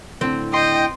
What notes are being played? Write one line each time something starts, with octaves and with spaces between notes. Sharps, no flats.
A2 D3 C4
D#5 G5 C6